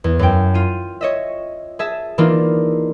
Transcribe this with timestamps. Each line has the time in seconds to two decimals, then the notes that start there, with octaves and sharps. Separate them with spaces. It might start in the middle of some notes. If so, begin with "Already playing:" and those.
0.04 E2
0.19 F#2 G5
0.54 F4 D#7
1.01 C#5 D#5 E5
1.79 G#4 E5 A5
2.18 E3 A#3 D4 D#4 F4